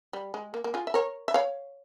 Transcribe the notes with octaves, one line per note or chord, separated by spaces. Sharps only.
G3
G#3
A#3
A#3
F4 G#4
E5
A#4 C#5
E5
C#5 F5